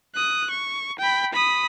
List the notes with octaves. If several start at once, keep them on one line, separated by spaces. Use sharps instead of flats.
D#6 F#6
C#6
G5 B5
B5 D#6